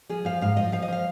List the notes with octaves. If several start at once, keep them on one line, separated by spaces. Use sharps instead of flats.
F3 G#4
F3 F5
G#2 F5
F3 D#5
F3 F5
D#5
F3 F5